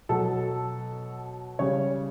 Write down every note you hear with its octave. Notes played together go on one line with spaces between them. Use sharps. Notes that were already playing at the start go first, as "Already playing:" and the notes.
B2 F#3 A4
C#3 G3 C#5